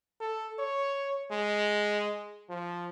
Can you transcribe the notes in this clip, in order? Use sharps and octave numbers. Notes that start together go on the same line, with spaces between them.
A4
C#5
G#3
F3